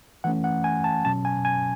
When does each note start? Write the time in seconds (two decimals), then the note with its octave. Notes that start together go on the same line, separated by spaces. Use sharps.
0.24 E3 A3 C#4 F#5
0.44 F#5
0.64 G#5
0.84 A5
1.05 B2 F#3 C#4 A5
1.25 G#5
1.45 G#5